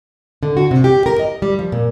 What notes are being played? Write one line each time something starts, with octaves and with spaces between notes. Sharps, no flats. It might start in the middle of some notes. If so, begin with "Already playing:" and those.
D3
F#4
C3
G4
A#4
D#5
G3
F3
A#2